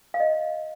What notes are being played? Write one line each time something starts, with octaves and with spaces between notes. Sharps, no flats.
F5
D#5